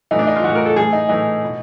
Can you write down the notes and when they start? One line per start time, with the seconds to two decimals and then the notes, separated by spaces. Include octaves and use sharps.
0.11 A2 E3 D#4
0.19 D4
0.27 D#4
0.36 F4
0.44 A2 E3 F#4
0.55 A#4
0.66 A4
0.76 A2 E3 G#4
0.93 D#4
1.09 A2 E3 D#4
1.44 B2